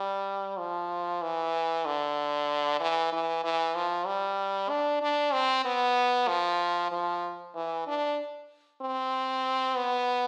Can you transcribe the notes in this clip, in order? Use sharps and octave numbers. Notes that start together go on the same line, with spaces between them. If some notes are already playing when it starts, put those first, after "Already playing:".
Already playing: G3
F3
E3
D3
E3
E3
E3
F3
G3
D4
D4
C4
B3
F3
F3
E3
D4
C4
B3